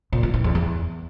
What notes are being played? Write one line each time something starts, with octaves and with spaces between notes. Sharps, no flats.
A#2
F3
E3
E2
E2